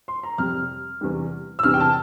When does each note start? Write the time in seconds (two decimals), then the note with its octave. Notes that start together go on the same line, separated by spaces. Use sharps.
0.08 C6
0.23 A#5
0.38 F2 C3 G3 F6
1.01 E2 C3 E3 G3
1.59 E6
1.63 E2 C3 E3 G3 F6
1.74 G5
1.80 A5